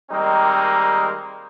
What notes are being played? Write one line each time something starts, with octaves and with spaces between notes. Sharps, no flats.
D#3 G3 G#3 A#3 C4 D#4